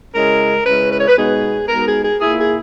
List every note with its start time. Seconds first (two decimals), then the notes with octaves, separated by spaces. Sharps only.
0.14 C#3 G#3 C#4 E4 A#4
0.66 C#3 G#3 C#4 E4 B4
0.91 B4
0.99 C#5
1.07 B4
1.17 B2 G#3 B3 D#4 G#4
1.68 B2 G#3 B3 D#4 A#4
1.86 G#4
2.03 G#4
2.19 A#2 A#3 E4 G#4
2.38 G#4